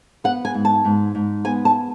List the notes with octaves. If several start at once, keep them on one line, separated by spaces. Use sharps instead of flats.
B3 F#5
G#5
G#2
A5
G#2
G#2
B3 G#5
A5